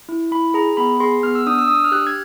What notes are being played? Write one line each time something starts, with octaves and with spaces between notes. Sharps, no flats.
E4
E4 B5
G#4 A#5
B3 B5
G#4 C6
B3 F6
E6
D4 D#6
E6
D4 D#6
E6
F6
G4 F#6
G#6